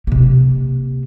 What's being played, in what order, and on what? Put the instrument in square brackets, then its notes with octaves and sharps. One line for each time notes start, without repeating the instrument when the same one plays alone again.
[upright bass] C3 A#3